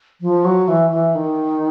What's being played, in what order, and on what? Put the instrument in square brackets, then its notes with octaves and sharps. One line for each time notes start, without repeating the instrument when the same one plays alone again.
[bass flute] F3
F#3
E3
E3
D#3